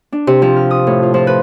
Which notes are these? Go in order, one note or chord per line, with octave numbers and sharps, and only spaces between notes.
D4
C3
F3
F6
D#6
A2
F4
F3
B4